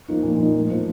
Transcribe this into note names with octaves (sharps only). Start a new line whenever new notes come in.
F3 A#3 D#4
A#2
F3 A#3 D#4
A2
F3 C4